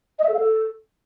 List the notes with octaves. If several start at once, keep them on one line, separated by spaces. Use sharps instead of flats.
D#5
E5
A4
F5
A4